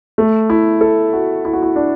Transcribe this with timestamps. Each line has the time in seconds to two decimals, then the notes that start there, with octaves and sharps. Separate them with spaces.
0.18 A3
0.50 E4
0.81 A4
1.13 F#4
1.45 E4
1.53 F#4
1.62 E4
1.76 D4